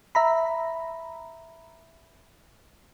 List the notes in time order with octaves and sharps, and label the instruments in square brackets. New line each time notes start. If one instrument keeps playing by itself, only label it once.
[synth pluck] E5 A#5 B5